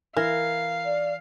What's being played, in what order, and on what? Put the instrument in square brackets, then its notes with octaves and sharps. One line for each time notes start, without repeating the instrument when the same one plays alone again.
[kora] E3 [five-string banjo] A#4 [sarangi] F5
[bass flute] D5